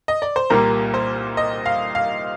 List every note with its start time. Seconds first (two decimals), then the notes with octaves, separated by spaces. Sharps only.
0.08 D#5
0.22 D5
0.36 C5
0.50 C2 A#2 G3 A#3 A#4
0.94 C5
1.37 D#5
1.66 F5
1.95 F5